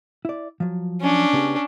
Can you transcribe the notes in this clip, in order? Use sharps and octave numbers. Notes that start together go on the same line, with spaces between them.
E4 D5
F3 F#3
C#4 D4
C#3 B3 G4